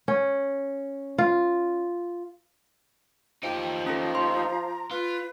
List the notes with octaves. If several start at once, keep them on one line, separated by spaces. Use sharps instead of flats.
C#4
F4
F3 D#4 G4 G5 D7
C#4 A4 A#5
C6
F4 B4